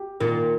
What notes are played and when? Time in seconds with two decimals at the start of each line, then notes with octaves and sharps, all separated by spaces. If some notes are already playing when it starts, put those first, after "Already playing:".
Already playing: G4
0.20 A#2 D#3